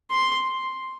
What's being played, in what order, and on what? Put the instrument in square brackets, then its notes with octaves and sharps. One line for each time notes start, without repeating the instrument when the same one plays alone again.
[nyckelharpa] C6